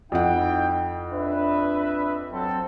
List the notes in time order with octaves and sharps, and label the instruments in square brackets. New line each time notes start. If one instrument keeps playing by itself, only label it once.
[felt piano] F2 F#5 [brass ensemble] D#4 E4 G5
[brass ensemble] D4 B4 E5
F#3 C4 A4